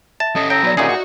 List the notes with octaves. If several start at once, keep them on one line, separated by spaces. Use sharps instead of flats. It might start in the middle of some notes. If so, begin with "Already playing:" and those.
E5 A5
C#4 A4 D#5
C#5 G5 A#5 D#6 E6
F#3 B3 D5 B5
A#2 C#4 D#4 G4 G#4 D#5 E5 F#5
F#4